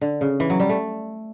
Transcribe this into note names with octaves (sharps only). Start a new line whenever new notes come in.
D3
C#3
E3
F#3
G3
A3